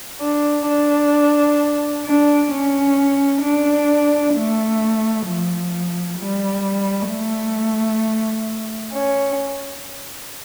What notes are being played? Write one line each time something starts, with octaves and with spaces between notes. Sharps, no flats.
D4
D4
D4
C#4
D4
A3
F3
G3
A3
C#4